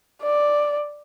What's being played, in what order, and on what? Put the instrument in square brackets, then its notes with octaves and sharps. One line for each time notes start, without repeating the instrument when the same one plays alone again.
[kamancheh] D5